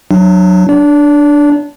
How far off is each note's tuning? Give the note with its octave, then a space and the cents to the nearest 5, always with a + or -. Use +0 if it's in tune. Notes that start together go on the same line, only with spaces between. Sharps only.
F#3 +0 D4 +30
D4 +0 D5 -40